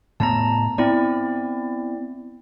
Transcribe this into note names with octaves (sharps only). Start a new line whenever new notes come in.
A2 B3 A5 A#5
B3 C4 E4 D5